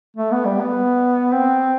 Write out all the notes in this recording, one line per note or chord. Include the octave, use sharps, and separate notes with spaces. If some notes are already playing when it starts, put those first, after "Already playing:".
A3
B3
G3
B3
C4